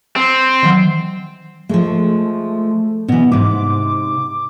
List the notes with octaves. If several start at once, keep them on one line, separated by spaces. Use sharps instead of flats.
C4
D#3 E3 F#3
F3 G#3 A3
B2 E3 B3
G#2 C3 D6